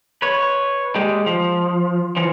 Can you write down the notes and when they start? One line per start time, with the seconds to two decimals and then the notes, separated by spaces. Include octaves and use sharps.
0.22 B4 C#5
0.95 G#3 G4
1.26 F3
2.17 E3 F3